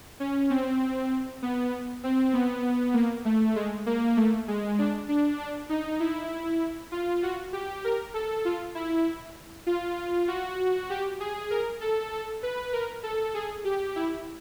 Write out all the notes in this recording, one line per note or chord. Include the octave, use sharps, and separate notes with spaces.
C#4
C4
B3
C4
B3
A#3
A3
G#3
A#3
A3
G#3
D4
D4
D4
D#4
E4
F4
F#4
G4
A#4
A4
F4
E4
F4
F#4
G4
G#4
A#4
A4
A4
B4
A#4
A4
G#4
G4
E4